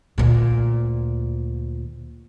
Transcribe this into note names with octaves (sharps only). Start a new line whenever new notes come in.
D2 A#2